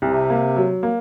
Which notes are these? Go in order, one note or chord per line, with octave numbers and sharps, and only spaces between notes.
C2 C3
A#3
F#3
A#3